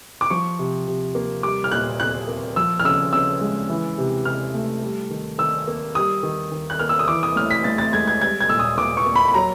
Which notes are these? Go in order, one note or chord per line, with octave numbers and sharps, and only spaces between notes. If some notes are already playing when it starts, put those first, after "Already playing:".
D6
F3 C#6
C3
C3
A#3
G3 D6
F6
A#2 F#6
A#2 F#6
A#3
F3 E6
F6
C#3 E6
C#3 E6
G#3
E3
C3
C3 F6
A3
G3
D#3
D#3 E6
A#3
G3 D#6
D#3
D#3
F#6
A#3 F6
E6
D#6
E3 D6
D#6
A2 F6
B6
A2 A6
A6
G#3 G#6
G#6
G3 G#6
G#6
A#2 E6
D#6
A#2 D6
C#6
A#3
B5
B5
F#3 A#5